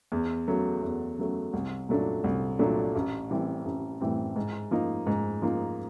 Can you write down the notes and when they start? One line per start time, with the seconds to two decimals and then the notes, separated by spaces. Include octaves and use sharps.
0.12 E2
0.47 C#3 F#3 A3
0.82 E2
1.18 C#3 F#3 A3
1.53 C2
1.89 A#2 F#3 A3 D4
2.24 C2
2.59 A#2 F#3 A3 D4
2.95 A1
3.30 A2 E3 G3 C4
3.65 A1
4.01 A2 E3 G3 C4
4.36 G#2
4.71 F3 A#3 D#4
5.06 G#2
5.42 F3 A#3 D#4